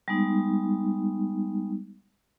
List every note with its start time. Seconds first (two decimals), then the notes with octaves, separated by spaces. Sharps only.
0.08 G3 G#3 B3 D#4